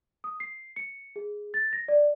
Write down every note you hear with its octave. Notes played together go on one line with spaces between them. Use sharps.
D#6
C7
C#7
G#4
A6
A#6
D5